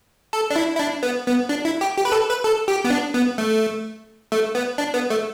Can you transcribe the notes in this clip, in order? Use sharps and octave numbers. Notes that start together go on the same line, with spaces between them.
A4
D4
E4
E4
D4
B3
B3
D4
E4
G4
G4
B4
A4
B4
A4
G4
B3
D4
B3
A3
A3
B3
D4
B3
A3